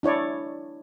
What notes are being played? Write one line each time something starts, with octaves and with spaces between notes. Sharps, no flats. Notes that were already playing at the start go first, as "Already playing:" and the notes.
D4 E4 C#5 D5